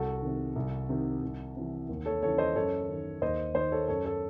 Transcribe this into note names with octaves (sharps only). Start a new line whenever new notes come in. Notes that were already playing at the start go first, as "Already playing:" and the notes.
Already playing: C2 F#4 A4
C3 D#3
C2
C3 D#3
C2
C3 E3
D#2
A4 C#5
C#3 E3 A4 C#5
C5 D#5
F#2 A4 C#5
D#3
D#2 C5 D#5
D#3 C5 D#5
A4 C#5
F#2 A4 C#5
A4 C#5